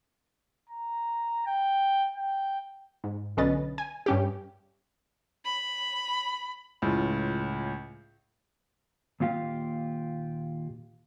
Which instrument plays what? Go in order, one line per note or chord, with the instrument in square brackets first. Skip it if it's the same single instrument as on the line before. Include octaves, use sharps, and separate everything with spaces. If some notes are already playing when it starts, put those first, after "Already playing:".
[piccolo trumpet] A#5
G5
G5
[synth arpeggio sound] G#2
B1 D3 C#4 B4 D#5 A6
G#5
G2 C#4 G4
[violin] B5
[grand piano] C#2 A2 F4
[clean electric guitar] D#2 A#2 F4 G4 F5